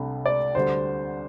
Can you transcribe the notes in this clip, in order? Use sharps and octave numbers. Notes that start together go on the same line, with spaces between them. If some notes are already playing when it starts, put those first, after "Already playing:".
Already playing: C2 C3 A3 D4
D5
D2 D3 G3 C5